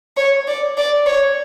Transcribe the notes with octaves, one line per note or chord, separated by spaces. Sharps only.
C#5
D5
D5
C#5